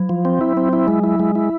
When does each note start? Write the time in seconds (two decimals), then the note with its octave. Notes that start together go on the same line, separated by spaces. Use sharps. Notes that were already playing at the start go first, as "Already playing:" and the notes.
Already playing: F#3
0.09 F3
0.25 C4
0.41 E4
0.57 C4
0.73 E4
0.88 G#3
1.03 E4
1.20 G#3
1.35 E4